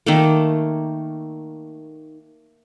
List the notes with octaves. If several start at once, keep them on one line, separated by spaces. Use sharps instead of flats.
D#3 A3 A#3